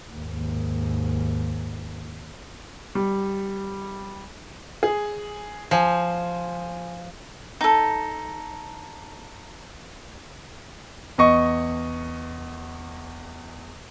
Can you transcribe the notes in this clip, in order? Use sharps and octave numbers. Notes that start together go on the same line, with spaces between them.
D#2 G#2
G3
G#4
F3 C5 G#5
D#4 A4
E2 D#5 C#6